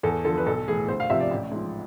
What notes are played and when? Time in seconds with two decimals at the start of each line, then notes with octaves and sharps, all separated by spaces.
0.03 E2 A4
0.25 D3 F3 A4
0.38 B4
0.46 B1 A4
0.68 A2 E3 G#4
0.88 D2 C5
1.00 F5
1.10 C3 F3 E5
1.20 D5
1.31 A1
1.52 G#2 F3